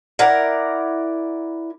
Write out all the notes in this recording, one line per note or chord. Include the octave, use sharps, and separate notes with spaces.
E4 A#4 D5 F#5